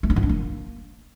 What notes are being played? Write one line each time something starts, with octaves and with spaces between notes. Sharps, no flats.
A3
D#4
F3
D4
A#3